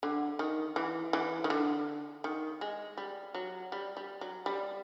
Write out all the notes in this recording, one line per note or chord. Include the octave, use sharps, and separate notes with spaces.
D3
D#3
E3
E3
D#3
D3
D#3
G#3
G3
F#3
G3
G3
F#3
G3